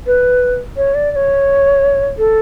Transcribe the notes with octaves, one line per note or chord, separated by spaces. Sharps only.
B4
C#5
D5
D5
C#5
A4